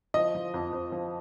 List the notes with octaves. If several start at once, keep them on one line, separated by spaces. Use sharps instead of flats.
F3 D#5
F3
F2
F2
F3